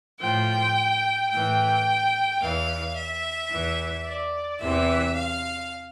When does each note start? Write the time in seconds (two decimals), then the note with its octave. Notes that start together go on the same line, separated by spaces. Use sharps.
0.21 A2 F3 G5
1.31 A2 E3 G5
2.40 E2 E3 F5
2.96 E5
3.50 E2 E3
4.05 D5
4.60 E2 C3 E3 E5
5.15 F5